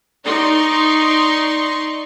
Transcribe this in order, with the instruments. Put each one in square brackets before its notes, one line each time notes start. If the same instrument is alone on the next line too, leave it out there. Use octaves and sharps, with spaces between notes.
[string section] D#4 D5 C6 C#6